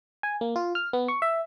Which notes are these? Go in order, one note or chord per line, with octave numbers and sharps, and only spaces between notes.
G#5
A#3
F4
F6
B3
C#6
E5